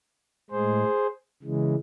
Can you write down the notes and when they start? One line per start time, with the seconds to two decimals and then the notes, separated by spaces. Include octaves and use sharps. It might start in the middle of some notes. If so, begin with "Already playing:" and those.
0.50 A2 G#3 G#4 C5
1.43 C#3 E3 G#3